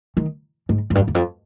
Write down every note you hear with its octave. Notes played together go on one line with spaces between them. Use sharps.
D#3
G#2
F#2
G2
E2
F2